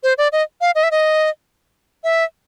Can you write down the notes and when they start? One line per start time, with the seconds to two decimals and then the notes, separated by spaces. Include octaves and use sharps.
0.03 C5
0.18 D5
0.32 D#5
0.61 F5
0.75 D#5
0.83 E5
0.91 D#5
2.04 E5